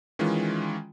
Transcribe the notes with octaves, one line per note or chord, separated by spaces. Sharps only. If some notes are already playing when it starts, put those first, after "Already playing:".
D#3 E3 G#3 C#4 F4